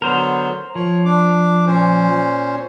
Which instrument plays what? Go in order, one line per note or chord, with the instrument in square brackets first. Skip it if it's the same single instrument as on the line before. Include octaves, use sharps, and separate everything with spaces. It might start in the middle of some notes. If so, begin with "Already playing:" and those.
[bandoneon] D3 F#3 B3 [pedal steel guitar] A#4 C5
[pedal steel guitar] F3 [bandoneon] C#5
[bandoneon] D4 D6
A#2 C#4 C5